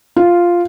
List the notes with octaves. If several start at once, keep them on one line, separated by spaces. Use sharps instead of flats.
F4